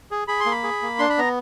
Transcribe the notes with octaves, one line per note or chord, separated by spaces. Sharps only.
G#4
G#4 B5
C6
A#3
B5
G#4
A#3
D4 C6
B5
B3 A#5